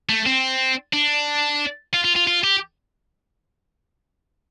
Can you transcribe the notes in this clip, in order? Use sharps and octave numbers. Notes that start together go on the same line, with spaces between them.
A3
C4
D4
F4
F4
F4
F4
G4